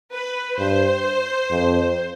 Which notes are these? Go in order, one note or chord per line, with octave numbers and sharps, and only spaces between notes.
B4
G2 C5
F2